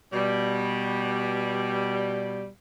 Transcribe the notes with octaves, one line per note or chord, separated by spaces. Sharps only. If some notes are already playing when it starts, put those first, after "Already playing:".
B2 G3